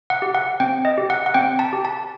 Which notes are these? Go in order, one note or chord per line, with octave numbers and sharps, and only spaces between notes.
F#5
G4
F#5
C4 G5
D#5
G4
F#5
F#5
C4 G5
A5
G4
A5